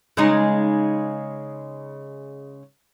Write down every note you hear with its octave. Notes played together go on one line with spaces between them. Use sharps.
C#3 G#3 D#4